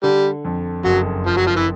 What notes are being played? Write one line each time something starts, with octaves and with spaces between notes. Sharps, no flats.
D3 G3
F2
F#1 F#3
F#1 F3
F#3
F3
E3